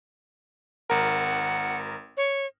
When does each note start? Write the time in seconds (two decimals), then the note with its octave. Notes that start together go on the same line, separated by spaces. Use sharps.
0.90 G#1 A#4 F#5
2.17 C#5